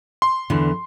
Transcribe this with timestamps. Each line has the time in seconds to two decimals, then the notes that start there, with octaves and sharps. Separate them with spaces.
0.22 C6
0.50 E2 D3 E3